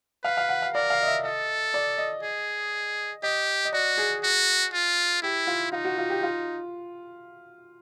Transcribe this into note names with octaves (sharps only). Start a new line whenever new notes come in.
B4 F5
F5
F#5
F5
A#4 D5
F5
D#5
E5
A4 D#5
D5
D#5
G#4
G4 D#5
D#5
F#4 D5
G#4
F#4
F4
E4 G4
F4
D#4 F4
F#4
F4
G4
F4